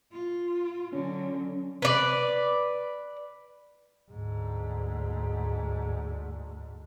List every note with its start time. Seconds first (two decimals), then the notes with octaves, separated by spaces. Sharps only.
0.12 F4
0.93 D3 F#3 C#4
1.82 B4 D5
4.11 D2 G#2